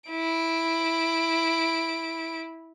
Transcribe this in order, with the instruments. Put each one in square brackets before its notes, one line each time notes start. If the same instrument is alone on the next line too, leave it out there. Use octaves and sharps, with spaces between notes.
[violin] E4 D7